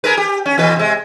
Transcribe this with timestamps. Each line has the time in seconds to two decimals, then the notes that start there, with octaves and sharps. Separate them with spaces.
0.04 G#4 A#4 B4
0.17 G4
0.46 C#4
0.58 E2 B2 B4
0.76 C3 G#3